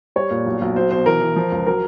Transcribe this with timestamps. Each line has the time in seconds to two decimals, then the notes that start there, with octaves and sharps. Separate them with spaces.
0.16 G3 C#5
0.31 A#2
0.47 B1
0.62 B1
0.76 F#3 C5
0.91 B2 C5
1.06 E3 A#4
1.21 E3
1.36 F3
1.51 C#2
1.67 F#3 A#4